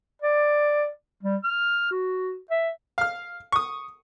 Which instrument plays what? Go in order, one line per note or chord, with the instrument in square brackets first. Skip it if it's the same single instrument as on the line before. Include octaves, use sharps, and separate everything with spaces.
[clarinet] D5
G3
F6
F#4
E5
[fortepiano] F5 F6
C#6 D#6